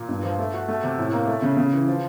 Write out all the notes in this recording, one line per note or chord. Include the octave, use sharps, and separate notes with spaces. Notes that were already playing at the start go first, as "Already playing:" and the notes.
Already playing: A#2
G2
F3
A3
F#4
A3
C3
A2
A#3
A3
C#3
C#3
E3
F3